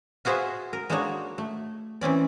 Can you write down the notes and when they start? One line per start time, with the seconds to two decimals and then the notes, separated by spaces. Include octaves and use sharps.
0.25 F4 F#4 G#4 C5 D#5 E5
0.73 A#4
0.90 G#3 A#3 D4 D#4 F#4 C#5
1.38 A3
2.01 E3 C4 C#4 D5